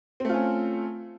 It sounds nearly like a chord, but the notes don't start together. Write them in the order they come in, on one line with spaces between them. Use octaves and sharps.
C4 A3 F4 C#4